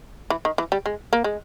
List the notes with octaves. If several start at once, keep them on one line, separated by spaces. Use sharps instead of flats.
E3
D#3
E3
G3
G#3
A#3
G#3